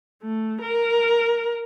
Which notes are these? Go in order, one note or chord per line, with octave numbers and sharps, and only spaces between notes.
A3
A#4